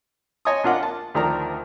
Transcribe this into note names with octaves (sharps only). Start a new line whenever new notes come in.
C#5 D#5 G#5 A5 C6 D#6
A#1 D4 F4 A#4 F#5 D6
A5
D2 D#3 F3 A#4 D5 A#5